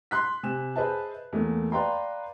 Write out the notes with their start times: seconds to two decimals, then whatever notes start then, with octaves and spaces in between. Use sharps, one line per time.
0.11 C6 F#6 B6
0.43 C3 G#5 E7
0.76 G#4 B4 C5 D#5 E5 A5
1.33 E2 E3 A3 A#3
1.72 B4 D5 F5 G5 A#5 C6